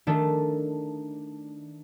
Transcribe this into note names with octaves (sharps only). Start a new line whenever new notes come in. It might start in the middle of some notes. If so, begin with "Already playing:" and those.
D#3 A3 D4 A4